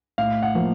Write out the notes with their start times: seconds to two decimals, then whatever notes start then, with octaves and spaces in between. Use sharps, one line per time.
0.18 A2 F5
0.43 F#5
0.55 F3 A#3